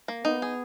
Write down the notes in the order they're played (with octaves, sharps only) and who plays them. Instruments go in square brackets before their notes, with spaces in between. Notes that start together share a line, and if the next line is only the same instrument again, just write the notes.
[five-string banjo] A#3
[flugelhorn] B3 [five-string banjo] D#4
[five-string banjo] G#4